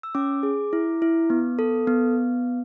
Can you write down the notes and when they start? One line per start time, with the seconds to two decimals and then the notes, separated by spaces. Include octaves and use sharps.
0.03 E6
0.15 C#4 D6
0.43 G#4
0.73 E4
1.02 E4
1.30 B3
1.59 A4
1.87 B3